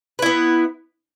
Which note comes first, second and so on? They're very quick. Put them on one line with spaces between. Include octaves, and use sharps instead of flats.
B4 E4 B3